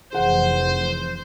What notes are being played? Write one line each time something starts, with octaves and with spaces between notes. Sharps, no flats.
F1 E3 G#4 C5 F#5